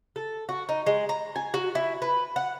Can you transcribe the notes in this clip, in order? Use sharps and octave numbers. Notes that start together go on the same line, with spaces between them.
A4
F#4
D#4
G#3
A#5
G#5
F#4
E4
B4
F#5